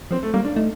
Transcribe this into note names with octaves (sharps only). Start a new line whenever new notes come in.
F3 C4
A3
G3 A#3
D4
A3 D#4